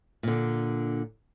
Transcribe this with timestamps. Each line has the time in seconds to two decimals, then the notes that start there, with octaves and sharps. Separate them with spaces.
0.23 A#2 D3